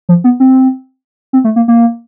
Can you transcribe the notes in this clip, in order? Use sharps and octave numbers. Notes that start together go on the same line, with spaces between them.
F3
B3
C4
C4
A3
A#3
A#3